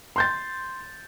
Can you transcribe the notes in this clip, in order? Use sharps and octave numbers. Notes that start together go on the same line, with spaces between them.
C6 G6 A6